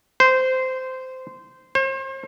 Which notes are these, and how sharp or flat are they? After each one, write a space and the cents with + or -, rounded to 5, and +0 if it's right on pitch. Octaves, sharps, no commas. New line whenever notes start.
C5 -15
C5 +40